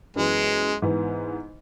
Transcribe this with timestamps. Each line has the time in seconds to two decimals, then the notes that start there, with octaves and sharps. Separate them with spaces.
0.16 F#2 E3 G#3 B3
0.82 G#2 E3 B3